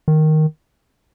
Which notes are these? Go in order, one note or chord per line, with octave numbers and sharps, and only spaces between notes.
D#3